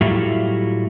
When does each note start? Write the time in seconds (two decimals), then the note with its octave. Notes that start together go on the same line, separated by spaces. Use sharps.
0.01 A2 F#3 G3 A3 E4 F4